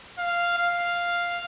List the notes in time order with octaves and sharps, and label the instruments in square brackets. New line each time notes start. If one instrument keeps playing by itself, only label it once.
[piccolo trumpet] F5
F5